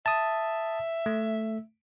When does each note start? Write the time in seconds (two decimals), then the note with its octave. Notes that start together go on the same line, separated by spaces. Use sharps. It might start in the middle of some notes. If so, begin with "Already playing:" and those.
0.06 E5 A5 D#6
1.06 A3